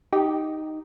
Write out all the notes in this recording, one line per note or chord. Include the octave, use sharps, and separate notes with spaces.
D#4 G4